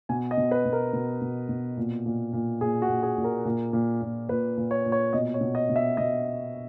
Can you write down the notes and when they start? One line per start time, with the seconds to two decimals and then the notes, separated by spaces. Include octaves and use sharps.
0.09 B2 G#5
0.31 D#5
0.37 B2
0.51 B4
0.65 B2
0.73 A#4
0.93 B2
1.21 B2
1.49 B2
1.77 A#2
2.06 A#2
2.33 A#2
2.61 A#2 G#4
2.82 F#4
2.89 A#2
3.03 G#4
3.18 A#2
3.24 A#4
3.45 A#2
3.73 A#2
4.02 A#2
4.29 A#2 B4
4.57 A#2
4.71 C#5
4.86 A#2
4.92 C#5
5.13 B2 D#5
5.34 C#5
5.41 B2
5.55 D#5
5.69 B2
5.76 E5
5.97 B2 D#5